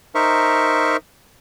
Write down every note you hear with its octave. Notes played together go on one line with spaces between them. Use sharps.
D#4 A#4 C5 E5 C#6